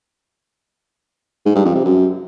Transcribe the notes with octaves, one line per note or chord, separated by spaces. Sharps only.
G#2
G2
F2
C3
F#2